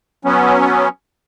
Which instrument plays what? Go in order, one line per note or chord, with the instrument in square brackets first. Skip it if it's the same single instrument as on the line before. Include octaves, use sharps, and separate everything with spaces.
[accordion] F#3 B3 C#4